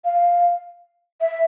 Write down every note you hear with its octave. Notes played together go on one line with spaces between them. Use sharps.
F5
E5